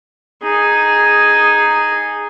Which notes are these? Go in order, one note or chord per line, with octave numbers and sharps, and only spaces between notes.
D#4 G#4